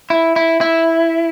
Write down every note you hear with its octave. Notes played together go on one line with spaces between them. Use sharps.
E4
E4
E4